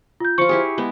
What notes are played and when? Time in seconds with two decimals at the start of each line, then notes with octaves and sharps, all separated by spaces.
0.20 F4 G6
0.38 F3 F4 C#6 C#7
0.49 E4 G4 G#4
0.78 G#3 B3